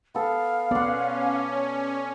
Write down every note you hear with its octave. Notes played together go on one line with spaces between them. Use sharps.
B3 A4 F5
B3 C#4 D5 F#5 C6